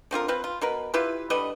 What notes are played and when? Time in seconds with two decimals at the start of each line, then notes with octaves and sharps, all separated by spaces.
0.11 D3 C4 F4 A#4
0.28 C4 F4 B4
0.44 F4
0.61 B2 A#4 B4
0.94 E4 F4 G4 B4
1.30 D3 G3 B4 D#5